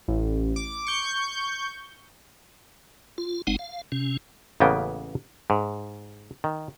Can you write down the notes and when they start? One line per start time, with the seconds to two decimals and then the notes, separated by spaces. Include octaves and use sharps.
0.08 A1
0.56 D6
0.87 C#6 G6
3.18 F4
3.47 G1 G#3 C4 D#4 F#5
3.59 F5
3.92 C3 C#4
4.60 A1 C#3 A#3 B3 G5
5.50 G#2
6.44 D#3